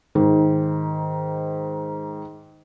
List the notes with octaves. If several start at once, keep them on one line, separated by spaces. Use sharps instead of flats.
G#2 D#3